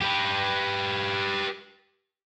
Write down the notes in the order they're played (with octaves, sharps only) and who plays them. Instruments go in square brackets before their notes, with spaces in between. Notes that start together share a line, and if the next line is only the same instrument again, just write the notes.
[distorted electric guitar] G4 B4